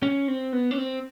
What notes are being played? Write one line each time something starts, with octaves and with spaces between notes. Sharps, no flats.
C#4
C4
B3
C#4
C4